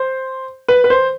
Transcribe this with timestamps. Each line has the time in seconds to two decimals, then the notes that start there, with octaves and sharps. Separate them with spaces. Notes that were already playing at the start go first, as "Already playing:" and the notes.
Already playing: C5
0.68 B4
0.84 B4
0.90 C5